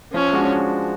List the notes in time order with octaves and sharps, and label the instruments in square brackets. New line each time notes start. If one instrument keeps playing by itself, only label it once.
[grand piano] F3 [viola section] C#4
[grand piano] G#3 D4 F#4